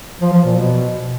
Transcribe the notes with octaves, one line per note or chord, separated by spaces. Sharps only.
F3
F3
A#2
B2